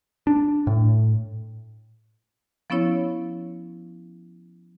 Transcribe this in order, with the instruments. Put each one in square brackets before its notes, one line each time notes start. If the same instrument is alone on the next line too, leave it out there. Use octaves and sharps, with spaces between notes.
[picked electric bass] D4
A2
[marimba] F3 B3 C#4 E4 C#5